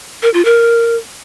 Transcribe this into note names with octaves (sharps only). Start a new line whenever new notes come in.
A#4
F4
A#4